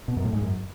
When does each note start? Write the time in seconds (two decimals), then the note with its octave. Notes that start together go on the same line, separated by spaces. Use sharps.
0.08 B2
0.16 F#2
0.25 A2
0.33 G#2
0.42 F#2